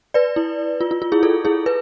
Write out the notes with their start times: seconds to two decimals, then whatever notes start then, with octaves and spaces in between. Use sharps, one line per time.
0.14 B4 D5
0.36 E4
0.81 F4
0.91 F4
1.02 F4
1.12 E4 G#4
1.23 F4 A4
1.45 E4 G#4
1.66 B4